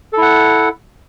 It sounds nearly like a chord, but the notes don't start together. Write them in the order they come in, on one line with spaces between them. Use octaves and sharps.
A4 E4 F#5